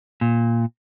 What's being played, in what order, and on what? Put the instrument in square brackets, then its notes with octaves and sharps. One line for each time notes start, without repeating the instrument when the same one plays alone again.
[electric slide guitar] A#2